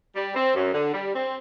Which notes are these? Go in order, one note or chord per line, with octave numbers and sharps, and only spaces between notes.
G3
C4
F#2
D3
G3
C4